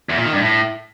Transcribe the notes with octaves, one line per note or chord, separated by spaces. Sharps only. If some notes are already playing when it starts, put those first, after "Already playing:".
E2
A#2
D#3
G2
A2